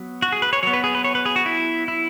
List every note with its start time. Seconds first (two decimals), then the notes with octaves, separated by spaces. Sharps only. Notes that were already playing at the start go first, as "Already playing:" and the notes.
Already playing: F#3 B3
0.22 F#4
0.32 G#4
0.42 B4
0.53 C#5
0.63 F#3 B3 C#5
0.73 B4
0.84 G#4
0.95 B4
1.04 C#5
1.15 B4
1.26 G#4
1.36 F#4
1.46 E4
1.88 E4